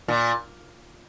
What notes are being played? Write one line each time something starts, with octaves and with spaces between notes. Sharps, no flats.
A#2